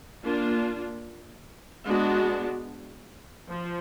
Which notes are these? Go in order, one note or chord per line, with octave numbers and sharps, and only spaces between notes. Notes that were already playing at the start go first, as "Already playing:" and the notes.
A#3 D4 F4
G#3 B3 D4 F#4
F3